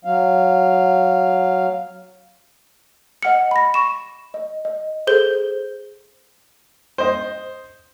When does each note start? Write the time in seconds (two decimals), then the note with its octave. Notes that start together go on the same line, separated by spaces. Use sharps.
0.05 F#3 F5
3.23 D#5 F#5 F6 C#7
3.51 B5 A#6
3.74 C#6 E7
4.34 D#5
4.65 D#5
5.07 G#4 A4 C5 G6 G7
6.98 C5 D#5